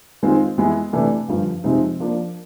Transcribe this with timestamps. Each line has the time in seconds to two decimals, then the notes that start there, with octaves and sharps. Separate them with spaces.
0.22 D#3 G#3 C4 F4
0.58 E3 G#3 B3 E4
0.93 C3 E3 A3 D4
1.28 G2 D3 F3
1.64 C3 F3 G#3 C4 D#4
2.00 F3 A#3 D4